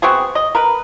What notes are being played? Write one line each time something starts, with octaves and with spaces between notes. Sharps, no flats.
B3 C4 F#4 G#4
D#5
A#4 B4